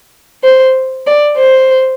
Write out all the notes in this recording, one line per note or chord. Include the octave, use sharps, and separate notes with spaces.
C5
D5
C5